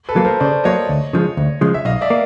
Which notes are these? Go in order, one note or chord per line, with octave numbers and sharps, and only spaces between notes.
A4 B4
F#3 A#3
A#4 C5
C#3 C5 D5
F#3 A#3 C#5 D#5
D2
C#3 F3 G#3
D2
C#3 F3 G#3
E5
B1 D#5 F5
D5 E5
A#3